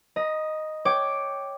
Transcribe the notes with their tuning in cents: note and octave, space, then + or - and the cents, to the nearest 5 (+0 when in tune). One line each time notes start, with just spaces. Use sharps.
D#5 +0 A#5 +40
C#5 +0 G5 +0 D6 +0